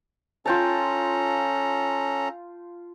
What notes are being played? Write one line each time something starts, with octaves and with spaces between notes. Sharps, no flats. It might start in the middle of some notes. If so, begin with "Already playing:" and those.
C#4 F4 A4 G5 A5 A#5